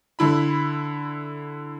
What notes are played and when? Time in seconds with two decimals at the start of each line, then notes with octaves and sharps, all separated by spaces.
0.19 D3 E4 B5